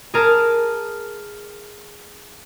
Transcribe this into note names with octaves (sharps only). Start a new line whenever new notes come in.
G#4 A#4 A5